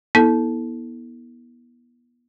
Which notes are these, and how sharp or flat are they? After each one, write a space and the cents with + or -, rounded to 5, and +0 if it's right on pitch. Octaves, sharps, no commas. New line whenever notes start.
B3 -30 E4 -40 A4 +0